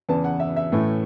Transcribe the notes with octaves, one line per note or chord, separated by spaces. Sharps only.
E2 C#3 E3 B3 A5
F#5
E5
E5
A2 E3 A3 C#4